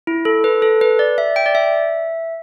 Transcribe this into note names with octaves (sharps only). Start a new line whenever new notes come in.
E4
A4
B4
A4
B4
D5
E5
G5
D5
E5